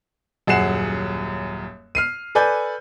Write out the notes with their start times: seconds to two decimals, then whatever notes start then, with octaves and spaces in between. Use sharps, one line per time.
0.47 D#1 F#2 G#4 F#5 C7 E7
1.95 F6 C7 D#7
2.35 A4 B4 D5 G#5 G6